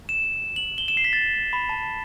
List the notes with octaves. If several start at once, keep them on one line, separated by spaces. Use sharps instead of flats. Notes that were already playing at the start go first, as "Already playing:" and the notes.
E7
F#7
G7
E7
C7
B6
A6
B5
A5